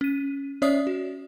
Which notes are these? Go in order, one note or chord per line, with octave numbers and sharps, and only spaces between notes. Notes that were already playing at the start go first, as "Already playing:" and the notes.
C#4 D#7
C#4 C#5 D5 E5 D#6 C7
F#4